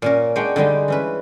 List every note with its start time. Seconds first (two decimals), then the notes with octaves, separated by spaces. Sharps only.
0.02 A#2 C#4 A#4
0.36 G#3 D4 C#5 F#5 G5
0.56 D3 G3 G#3 D#4
0.88 E3 C#4 B4